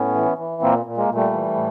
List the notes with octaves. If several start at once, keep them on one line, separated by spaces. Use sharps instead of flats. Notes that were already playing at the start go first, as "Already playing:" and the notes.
Already playing: A2 B3 C#4
E3
E3
A#2 A#3 C4
A#2
G#3 A#3
A#2
G3 A3
E3
A2